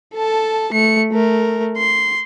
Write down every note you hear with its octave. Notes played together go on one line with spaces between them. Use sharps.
A4 A5
A3 C#7
A3 A#4
C6